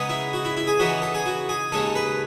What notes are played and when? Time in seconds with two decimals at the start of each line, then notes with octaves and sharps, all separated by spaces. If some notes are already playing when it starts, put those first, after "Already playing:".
Already playing: C#3 G#3 B3 D#4
0.10 E4
0.33 F#4
0.45 E4
0.57 E4
0.67 G#4
0.79 C#3 E3 B3 D#4 F#4
1.02 A4
1.15 G#4
1.26 F#4
1.49 G#4
1.72 D#2 C#3 G#3 D#4 A4
1.95 B4